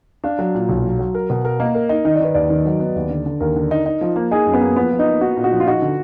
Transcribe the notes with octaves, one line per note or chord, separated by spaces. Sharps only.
D4 F5
F#3
A#2
B1
F#3
F#3
A#4
B2
A#4
A#3 D#5
A#4
D#4
D#3 D#5
D5
D#3 B4
D#2 D5
D#3
F#3
B3
D#2
D3
D3
D#2 A#4
D3
D#4
D#4
F3
A#3
D#4 G#4
F#2
B3
A#3
F3 B3
F3
D#4
A#3
D#4 F#4
A#2
F#4
F3
F4
D#4 F#4
D3